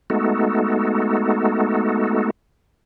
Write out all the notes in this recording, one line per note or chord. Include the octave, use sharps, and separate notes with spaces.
G#3 A3 B3 D#4 F#4 A4